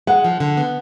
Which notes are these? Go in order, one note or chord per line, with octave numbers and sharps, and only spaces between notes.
G#3 F#5
F3
D3
B3